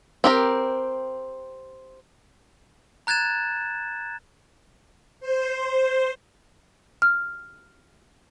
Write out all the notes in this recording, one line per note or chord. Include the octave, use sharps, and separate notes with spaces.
C4 G4 A#4
A#5 F#6 G#6 A6 E7
C5
F6